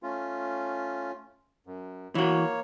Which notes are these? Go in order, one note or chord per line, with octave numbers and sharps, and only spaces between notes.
A3 C#4 F4
F#2
E3 A#3 F#4 C#5